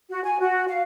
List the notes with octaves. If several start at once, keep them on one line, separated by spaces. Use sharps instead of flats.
F#4
G#5
F#4
F5